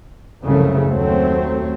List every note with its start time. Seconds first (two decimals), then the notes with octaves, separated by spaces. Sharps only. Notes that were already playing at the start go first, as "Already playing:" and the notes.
0.42 C2 F#2 C#3 F3 A3
0.88 D#2 F#3 A3 C4